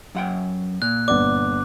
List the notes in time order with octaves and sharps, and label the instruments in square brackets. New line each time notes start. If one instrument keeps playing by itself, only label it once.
[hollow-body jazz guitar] F#2 F#5 G5
[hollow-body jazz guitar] A#2 [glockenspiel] F#6
[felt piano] G1 B3 D5 [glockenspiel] D6